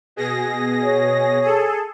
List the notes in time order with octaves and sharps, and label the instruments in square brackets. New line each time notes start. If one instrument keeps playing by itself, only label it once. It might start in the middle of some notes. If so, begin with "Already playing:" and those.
[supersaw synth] B2 G#4 A#6
[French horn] C#5
[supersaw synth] G#4 A4